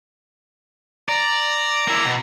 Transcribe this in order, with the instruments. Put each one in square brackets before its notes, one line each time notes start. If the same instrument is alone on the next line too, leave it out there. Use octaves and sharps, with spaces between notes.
[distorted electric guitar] D5 [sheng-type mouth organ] A#5
[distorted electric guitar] A#3 E4
B2